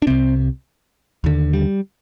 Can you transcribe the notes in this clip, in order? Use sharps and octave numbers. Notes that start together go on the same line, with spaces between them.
D4
C2 C3 C4
D#2 D3
G3